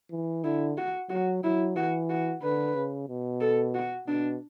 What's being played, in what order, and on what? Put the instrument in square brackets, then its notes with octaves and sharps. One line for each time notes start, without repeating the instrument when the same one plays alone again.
[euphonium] E3
[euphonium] D3 [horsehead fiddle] E4
[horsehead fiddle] F#4
[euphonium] F#3 [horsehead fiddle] F#4
[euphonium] F#3 [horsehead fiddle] E4
[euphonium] E3 [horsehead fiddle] F#4
[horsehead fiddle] F#4
[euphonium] D3 [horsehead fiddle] B4
[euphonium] C#3
B2
[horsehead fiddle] A4
F#4
[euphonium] B2 [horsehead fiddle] D4